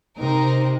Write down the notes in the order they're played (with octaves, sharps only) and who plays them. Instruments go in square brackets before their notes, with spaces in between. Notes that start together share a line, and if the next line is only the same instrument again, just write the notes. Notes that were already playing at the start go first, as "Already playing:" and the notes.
[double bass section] C3 [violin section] C4 D#4 A#4